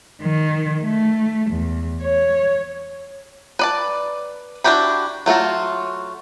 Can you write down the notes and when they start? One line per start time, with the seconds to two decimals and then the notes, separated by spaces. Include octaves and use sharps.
0.22 D#3
0.83 A3
1.51 E2
2.03 C#5
3.59 B4 D5 A5
4.64 D4 E4 F#4 G4 B5
5.26 F#3 A3 F4 F#4